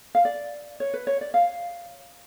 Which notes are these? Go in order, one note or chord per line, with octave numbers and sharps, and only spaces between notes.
F5
D5
C#5
B4
C#5
D5
F5